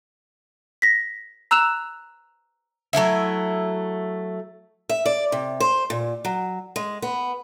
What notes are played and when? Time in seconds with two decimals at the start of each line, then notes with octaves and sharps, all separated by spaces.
0.82 A#6 B6
1.51 A#5 E6 F#6 E7 F7
2.93 F#3 A3 E4 E5
4.89 E5
5.06 D5
5.32 C3
5.60 C5
5.90 A#2
6.25 F#3
6.76 G#3
7.02 B3